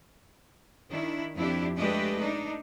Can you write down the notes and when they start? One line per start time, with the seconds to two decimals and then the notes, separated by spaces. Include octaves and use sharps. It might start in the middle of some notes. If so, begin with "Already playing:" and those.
0.89 D#3 D4 E4
1.35 F2 D4 E4 G4
1.77 G#3 A3 D4 G4 B4 D#5
2.19 D4 D#4